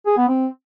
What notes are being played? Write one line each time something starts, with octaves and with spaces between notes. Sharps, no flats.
G#4
B3
C4